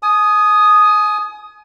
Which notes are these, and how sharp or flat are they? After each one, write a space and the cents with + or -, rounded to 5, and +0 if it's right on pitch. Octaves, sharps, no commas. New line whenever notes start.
G#5 +30 D#6 +0